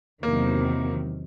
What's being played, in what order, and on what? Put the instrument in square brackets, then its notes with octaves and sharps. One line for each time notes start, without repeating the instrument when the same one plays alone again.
[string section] E2 C3 D#3 F#3 [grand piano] A#3